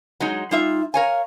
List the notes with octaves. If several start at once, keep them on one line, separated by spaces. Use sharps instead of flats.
F#3 G#3 D#4
G3 D#4 F4 E5
A#4 C#5 F5 G#5